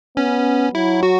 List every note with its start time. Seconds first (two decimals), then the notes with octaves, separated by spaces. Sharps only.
0.17 B3 C#4
0.75 F#3 E4
1.03 F#4